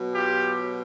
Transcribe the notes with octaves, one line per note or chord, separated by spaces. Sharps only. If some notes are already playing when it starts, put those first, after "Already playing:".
Already playing: B2 F#3
F4 G4